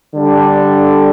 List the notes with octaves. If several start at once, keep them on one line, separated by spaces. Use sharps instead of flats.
D3 G3 D4 A4